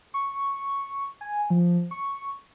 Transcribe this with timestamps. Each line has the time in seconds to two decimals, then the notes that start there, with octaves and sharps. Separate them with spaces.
0.14 C#6
1.21 G#5
1.50 F3
1.91 C#6